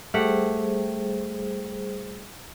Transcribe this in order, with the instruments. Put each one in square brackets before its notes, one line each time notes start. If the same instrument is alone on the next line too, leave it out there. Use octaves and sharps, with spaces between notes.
[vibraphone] G3 G#4 C5 [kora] A3 G4 F#5